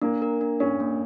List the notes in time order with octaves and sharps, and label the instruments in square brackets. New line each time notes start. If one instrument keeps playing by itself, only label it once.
[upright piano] A#3 [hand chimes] D4
[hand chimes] A#4
D4
[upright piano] C#4 [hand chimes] D4
[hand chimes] A#3